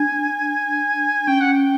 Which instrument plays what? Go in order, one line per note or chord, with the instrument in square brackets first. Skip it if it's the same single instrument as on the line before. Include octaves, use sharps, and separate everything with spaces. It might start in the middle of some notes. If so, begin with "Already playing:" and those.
Already playing: [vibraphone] D4 [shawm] G#5
[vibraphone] C#4 [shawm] G5
[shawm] F#5
G5